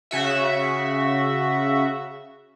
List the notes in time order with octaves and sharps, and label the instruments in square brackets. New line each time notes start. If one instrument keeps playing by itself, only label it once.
[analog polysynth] C#3 F#4 E5